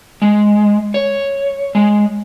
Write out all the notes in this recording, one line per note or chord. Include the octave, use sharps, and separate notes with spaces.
G#3
C#5
G#3